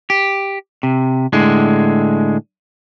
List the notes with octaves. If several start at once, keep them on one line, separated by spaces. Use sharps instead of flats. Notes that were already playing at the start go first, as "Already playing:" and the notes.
G4
C3
A2 D3 G#3